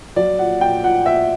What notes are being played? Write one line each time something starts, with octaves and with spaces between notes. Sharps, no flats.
F#3 D5
A#2 F#5
A#2 G5
A#2 F#5
A#2 E5